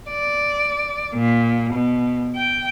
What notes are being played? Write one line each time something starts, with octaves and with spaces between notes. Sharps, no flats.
D5
A#2
B2
G5